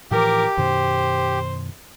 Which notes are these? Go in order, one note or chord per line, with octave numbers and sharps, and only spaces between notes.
A2 E3 F3 G4 A#4 D6
F#2 B2 D#3 C5